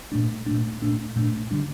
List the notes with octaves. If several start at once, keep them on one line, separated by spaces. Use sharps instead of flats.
A#2 A3 D4
A#2 A3 D4
A#2 A3 D4
A#2 A3 D4
D3 G3 D4